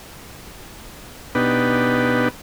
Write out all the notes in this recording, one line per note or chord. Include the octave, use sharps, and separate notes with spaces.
B2 B3 D4 D#4 G4 B4